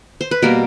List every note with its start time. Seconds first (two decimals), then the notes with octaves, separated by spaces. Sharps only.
0.21 C5
0.31 B4
0.42 B2 G3 A#3 A#4